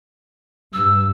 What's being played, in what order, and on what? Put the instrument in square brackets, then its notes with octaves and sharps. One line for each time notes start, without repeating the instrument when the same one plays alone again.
[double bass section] G2 [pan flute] E6